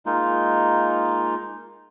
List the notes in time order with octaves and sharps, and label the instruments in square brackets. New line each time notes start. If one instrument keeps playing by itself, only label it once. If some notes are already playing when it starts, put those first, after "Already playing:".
[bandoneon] G#3 A#3 D#4 F4